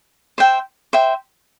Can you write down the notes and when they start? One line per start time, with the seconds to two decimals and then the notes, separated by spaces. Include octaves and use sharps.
0.38 C5 E5 G5
0.93 C5 E5 G5